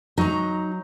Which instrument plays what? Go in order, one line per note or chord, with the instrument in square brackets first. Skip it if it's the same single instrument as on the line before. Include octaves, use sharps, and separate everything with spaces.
[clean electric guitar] F#3 [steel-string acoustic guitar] D#4 A#5